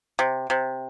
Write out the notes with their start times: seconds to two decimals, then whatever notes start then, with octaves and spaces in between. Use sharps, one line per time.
0.19 C3
0.50 C3